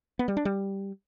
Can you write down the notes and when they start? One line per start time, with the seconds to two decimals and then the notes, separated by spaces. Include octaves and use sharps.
0.19 B3
0.28 G3
0.37 D4
0.45 G3